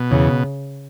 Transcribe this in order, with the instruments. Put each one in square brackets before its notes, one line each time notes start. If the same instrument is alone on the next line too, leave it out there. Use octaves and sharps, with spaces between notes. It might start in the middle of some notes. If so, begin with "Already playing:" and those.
Already playing: [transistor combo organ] B2
[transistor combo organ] E2 [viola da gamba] C#3